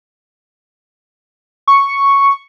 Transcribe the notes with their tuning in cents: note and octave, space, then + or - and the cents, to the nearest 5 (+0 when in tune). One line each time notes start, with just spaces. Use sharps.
C#6 +0